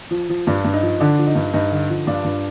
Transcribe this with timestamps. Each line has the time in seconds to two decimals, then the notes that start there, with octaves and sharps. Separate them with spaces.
0.11 F3
0.29 F3
0.47 G2 D4
0.65 G2
0.73 D#4
0.83 F3
1.00 D3 D4
1.18 F3
1.26 D#4
1.35 G2
1.53 G2 D#4
1.72 D3
1.90 F3
2.07 G2 D4 F4
2.25 G2